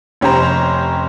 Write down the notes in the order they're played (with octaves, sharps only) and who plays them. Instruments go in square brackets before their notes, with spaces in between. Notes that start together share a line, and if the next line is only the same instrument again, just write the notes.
[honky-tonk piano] F1 C#4 G4 C5 A#5